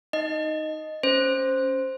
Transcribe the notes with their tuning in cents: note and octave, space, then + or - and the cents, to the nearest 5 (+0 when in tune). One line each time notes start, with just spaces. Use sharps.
D#4 +0 D#5 +0
C#4 +0 C5 +0